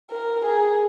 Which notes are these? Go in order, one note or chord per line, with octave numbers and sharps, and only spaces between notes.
A#4
G#4